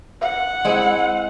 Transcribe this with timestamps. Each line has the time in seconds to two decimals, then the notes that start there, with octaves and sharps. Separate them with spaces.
0.21 F#5
0.65 G#3 C4 E4